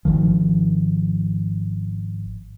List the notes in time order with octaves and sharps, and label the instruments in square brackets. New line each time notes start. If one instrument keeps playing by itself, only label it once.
[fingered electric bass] G#1 D2 D#3 F3